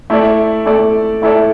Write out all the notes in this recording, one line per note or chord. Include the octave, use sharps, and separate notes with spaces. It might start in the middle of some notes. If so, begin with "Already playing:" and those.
A3 E4 A4 D5
A3 E4 A4 D5
A3 E4 A4 D5